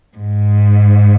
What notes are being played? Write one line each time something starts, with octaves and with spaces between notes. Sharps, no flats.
G#2